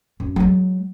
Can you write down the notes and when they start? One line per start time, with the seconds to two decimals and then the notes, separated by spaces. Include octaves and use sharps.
0.20 F#2
0.36 F#3 G#3